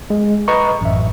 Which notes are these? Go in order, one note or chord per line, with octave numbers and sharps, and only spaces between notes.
G#3
B4 D#5 A#5 C#6
A1 F#2 E5